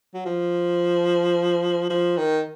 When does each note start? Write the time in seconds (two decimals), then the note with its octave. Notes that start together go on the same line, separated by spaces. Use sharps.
0.14 F#3
0.26 F3
1.90 F3
2.17 D#3